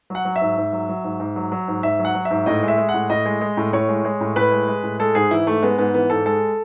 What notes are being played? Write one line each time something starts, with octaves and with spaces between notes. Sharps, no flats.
F#3 F#5
F#3
E5
G#2
G#2
F#3
F#3
G#2
G#2
F#3
F#3
G#2
G#2 E5
F#3
F#5
F#3
E5
G#2
A2 D#5
G#3
E5
G#3
F#5
A2
A2 D#5
G#3
G#3
A2
A2 C#5
G#3
G#3
A2
A2 B4
G#3
G#3
A2
G#3 A4
G#2 G#4
E3 E4
G#2 A3
G#3 B3
G#2 B3
E3 B3
G#2 A4
G#3 A4